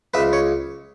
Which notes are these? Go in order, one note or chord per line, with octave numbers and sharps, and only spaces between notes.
C#2 B4 E5
C#5